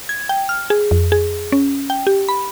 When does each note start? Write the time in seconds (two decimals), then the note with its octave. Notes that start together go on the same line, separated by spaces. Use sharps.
0.09 G#6
0.29 G5
0.49 F6
0.70 G#4
0.91 F2
1.12 G#4
1.52 C#4
1.90 G5
2.07 G4
2.29 B5